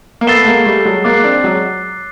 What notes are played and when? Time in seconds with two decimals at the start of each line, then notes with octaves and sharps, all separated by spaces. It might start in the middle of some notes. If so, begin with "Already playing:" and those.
0.21 A#3
0.27 A3 B3 E6 A6 C7 E7 G7
0.42 A3
0.46 G#3 A#3
0.66 G3 A3
0.85 F#3 G#3
1.04 G#3 A#3 D6 F#6 A6 C7
1.24 C4 D4
1.44 F#3 G#3